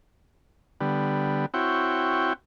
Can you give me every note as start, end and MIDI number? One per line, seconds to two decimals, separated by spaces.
0.80 1.46 50
0.80 1.46 55
0.80 1.46 59
1.54 2.33 60
1.54 2.33 64
1.54 2.33 66
1.54 2.33 73
1.54 2.33 79